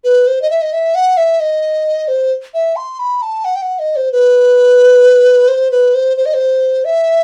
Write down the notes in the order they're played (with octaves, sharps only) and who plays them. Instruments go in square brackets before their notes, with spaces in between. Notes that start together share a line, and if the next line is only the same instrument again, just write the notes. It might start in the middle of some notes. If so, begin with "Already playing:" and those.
[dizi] B4
C5
D#5
E5
D#5
E5
F#5
E5
D#5
C5
E5
C6
B5
A5
F#5
G5
F#5
D#5
C5
B4
C5
B4
C5
C5
D#5
C5
E5